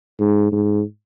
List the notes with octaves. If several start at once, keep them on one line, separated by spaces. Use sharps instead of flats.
G#2
G#2